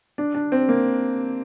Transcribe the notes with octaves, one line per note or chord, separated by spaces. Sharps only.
D4
D4
C4
A#3